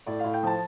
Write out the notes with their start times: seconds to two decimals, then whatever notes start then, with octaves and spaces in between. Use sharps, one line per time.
0.06 A2 D5
0.20 A2 F5
0.34 G5
0.43 F3 A5